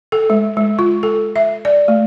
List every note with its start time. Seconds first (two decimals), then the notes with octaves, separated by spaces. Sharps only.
0.12 A4
0.30 G#3
0.57 G#3
0.79 F4
1.03 A4
1.36 E5
1.65 D5
1.88 A3